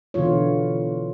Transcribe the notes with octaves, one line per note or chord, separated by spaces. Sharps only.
B2 D3 E3 F4 C#5